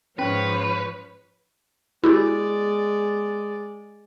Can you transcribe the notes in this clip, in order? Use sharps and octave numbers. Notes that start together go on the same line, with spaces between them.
G#2 F3 C#4 B4 C#5
G#3 E4 F#4 G4 D5